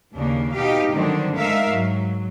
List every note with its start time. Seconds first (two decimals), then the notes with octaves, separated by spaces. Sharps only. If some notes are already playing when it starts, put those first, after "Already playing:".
0.14 D#2 C#3 A#3 D4
0.53 B2 D#4 G4 F5
0.92 D3 D#3 F#3 G3 C4 D4
1.36 G#3 D4 D#4 A#4 E5 F5
1.68 G#2 F#3